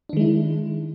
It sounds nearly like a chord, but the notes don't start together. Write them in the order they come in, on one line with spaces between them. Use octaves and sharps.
D4 D#3 G#3 E4